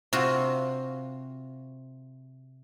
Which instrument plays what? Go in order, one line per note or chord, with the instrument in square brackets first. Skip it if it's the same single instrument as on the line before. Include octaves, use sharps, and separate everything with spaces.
[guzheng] C3 F4 F#4